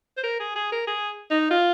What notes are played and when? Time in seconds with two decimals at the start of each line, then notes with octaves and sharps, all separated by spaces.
0.17 C5
0.23 A#4
0.40 G#4
0.56 G#4
0.72 A#4
0.87 G#4
1.30 D#4
1.51 F4